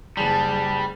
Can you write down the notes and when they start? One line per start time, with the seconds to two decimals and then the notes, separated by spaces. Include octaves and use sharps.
0.17 F#1 G3 G#4 A5